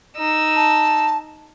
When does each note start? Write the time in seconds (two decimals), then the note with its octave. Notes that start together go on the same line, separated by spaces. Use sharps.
0.17 D#4 E6
0.56 A5